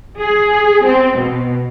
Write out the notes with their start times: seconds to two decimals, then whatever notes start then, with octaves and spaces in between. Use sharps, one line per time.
0.19 G#4
0.84 C4
1.15 B2